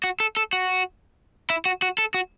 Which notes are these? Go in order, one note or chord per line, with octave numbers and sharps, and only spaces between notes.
F#4
A4
A4
F#4
E4
F#4
F#4
A4
F#4